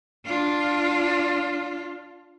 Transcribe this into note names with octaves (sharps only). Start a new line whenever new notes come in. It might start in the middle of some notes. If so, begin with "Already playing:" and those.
D4 F4